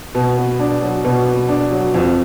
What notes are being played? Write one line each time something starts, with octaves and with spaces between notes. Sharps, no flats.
B2
B3
D4
F#3
B2
B3
D4
F#3
F2